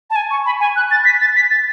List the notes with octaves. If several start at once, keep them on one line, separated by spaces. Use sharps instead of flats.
A5
G#5
C#6
B5
G#5
F#6
A6
B6
A6
B6
A6